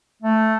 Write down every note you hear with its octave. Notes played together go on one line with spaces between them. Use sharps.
A3